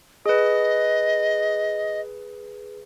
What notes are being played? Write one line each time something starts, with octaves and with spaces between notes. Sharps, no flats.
G#4 B4 D#5